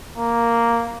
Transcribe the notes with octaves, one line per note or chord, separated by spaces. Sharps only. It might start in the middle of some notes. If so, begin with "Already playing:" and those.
A#3